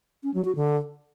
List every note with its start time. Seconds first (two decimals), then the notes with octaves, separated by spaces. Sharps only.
0.23 C#4
0.34 F#3
0.45 F#4
0.56 D3